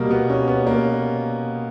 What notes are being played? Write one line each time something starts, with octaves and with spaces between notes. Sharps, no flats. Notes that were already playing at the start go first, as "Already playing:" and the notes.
Already playing: B2 G3 A#3
B3
C#4
B3
A#3